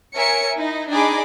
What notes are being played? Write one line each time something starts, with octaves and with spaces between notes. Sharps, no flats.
A#4 C#5 E5 G#5 C#7
D#4 E4
D4 D#4 G#4 D#5 B5 D6